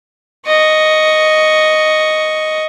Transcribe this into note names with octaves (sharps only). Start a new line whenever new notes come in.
D#5 C#6